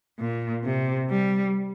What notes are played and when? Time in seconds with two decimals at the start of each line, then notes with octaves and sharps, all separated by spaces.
0.19 A#2
0.64 C3
1.10 G3